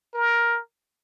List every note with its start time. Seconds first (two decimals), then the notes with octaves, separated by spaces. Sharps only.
0.14 A#4